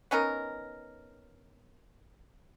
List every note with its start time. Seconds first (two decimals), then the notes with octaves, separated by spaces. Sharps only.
0.11 B3 C#4 D#4 A#4